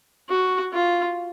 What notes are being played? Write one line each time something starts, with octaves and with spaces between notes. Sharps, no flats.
F#4
F4